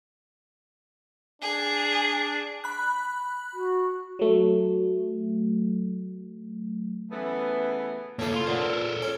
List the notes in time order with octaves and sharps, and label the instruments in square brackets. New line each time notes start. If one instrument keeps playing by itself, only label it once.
[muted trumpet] D4 [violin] G#4
[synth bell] B5 F#6
[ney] F#4
[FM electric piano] F#3 A3
[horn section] C#3 E3 A3 B3
[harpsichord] C#3 A4 D6 [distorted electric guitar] A#3 E4
[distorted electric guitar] F5 C6
[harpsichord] A#2 [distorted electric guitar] C5 F#5
[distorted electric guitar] A4 A#4
[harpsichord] C#4